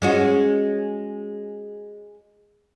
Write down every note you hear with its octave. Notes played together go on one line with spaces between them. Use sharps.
G#3 C#4 F#4